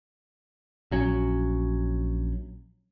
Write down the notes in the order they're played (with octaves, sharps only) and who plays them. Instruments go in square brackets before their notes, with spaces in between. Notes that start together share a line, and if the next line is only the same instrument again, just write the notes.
[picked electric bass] A#1 F#3 C#4